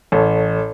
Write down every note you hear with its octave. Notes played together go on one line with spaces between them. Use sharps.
A1 A4 C#5